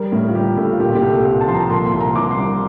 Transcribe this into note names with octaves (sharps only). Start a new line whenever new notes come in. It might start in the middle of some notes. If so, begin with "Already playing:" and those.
Already playing: G3 A#4
A2
F4
G3 G4
A2 A4
F4
A#2 G4
F4
G4
C2
A4
C2
A5
F3 C6
A#5
A#2 C6
C6
C2
A#5
C2 D6
C6
G3